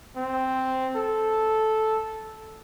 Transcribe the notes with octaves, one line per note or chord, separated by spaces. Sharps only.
C4
A4